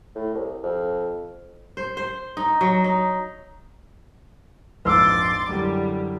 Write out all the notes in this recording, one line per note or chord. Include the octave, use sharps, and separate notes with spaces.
A2
C2
F2
C5
C5
D#4
F#3
D#4
A#1 F2 G#2 B4 C6 D6 E6 A6
F#2 D3 E3 G3